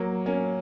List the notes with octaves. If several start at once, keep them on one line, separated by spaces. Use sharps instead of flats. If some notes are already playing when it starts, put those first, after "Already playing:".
Already playing: F#3 A#3
A#3 C#4